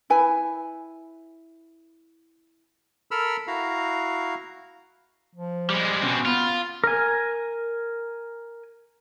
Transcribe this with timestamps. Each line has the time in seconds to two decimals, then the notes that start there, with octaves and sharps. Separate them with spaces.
0.10 E4 B4 G#5
3.11 A4 A#4 B5 E6 F6
3.47 E4 F#4 F5 A#5
5.35 F3
5.70 G3 G#3
6.02 B2 C4 C#4
6.26 B3 F4
6.84 A#4 G#5